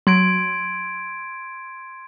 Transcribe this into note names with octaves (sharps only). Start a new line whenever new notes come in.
F#3 C6 G#6 D7